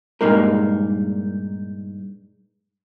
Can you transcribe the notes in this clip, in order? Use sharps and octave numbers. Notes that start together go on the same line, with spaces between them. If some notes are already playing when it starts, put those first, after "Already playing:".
G2 A#2 G#3 A#3 D#4 A#4